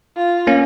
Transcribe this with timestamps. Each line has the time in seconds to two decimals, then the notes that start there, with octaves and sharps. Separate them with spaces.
0.16 F4
0.47 A#3 C#4